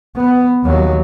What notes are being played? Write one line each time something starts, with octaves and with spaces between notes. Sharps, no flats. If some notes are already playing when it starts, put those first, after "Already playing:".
B3
D#2 F#3